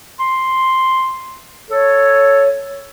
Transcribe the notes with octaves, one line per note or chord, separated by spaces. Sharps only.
C6
A4 C#5